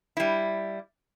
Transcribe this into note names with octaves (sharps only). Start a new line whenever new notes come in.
G3 E4